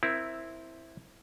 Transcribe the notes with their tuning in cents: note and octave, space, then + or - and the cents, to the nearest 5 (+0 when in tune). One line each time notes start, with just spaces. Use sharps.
C4 +0 E4 +0 A#4 +25